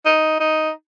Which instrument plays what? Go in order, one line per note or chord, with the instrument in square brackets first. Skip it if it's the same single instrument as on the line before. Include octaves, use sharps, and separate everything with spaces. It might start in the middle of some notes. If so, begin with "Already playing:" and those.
[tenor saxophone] D#4
D#4